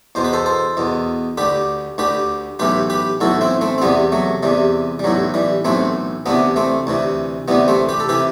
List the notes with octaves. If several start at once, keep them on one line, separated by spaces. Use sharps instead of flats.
E2 B2 C5
B4
A4 C5
A4 C5
E2 B2
D2 D3 G4 B4
D2 D3 G4 B4
B1 A2 E3 G4 B4
G4 B4
B1 A2 E3 F#4 A4
C4 E4
A3 C4
C4
E2 C3 E3 G3 B3
F#3 A3
E2 C3 E3 G3
G3
B1 A2 E3 F#3
E3 G3
B1 A2 E3 A3 C4
D2 C3 E3 B3 D4
A3 C4
D2 C3 E3
D2 C3 E3 G3 B3
A3 C4
G4 B4
A4
C3 E3 G4 B4